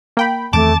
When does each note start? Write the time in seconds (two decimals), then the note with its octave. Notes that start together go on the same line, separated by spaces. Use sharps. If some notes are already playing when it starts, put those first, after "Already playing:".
0.17 A#3 G5 B5
0.53 E2 D#3 A3 C4 A5 D6